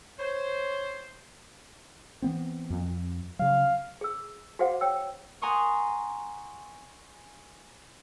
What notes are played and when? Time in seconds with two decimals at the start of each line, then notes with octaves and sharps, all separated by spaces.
0.19 C5 C#5
2.22 E3 B3 C4
2.70 F2
3.39 C#3 F#3 F5
4.01 G#4 E6
4.59 F#4 G#4 C5 F5 F#5
4.81 C#5 G5 E6
5.42 F#5 G#5 A#5 C6 C#6 D#6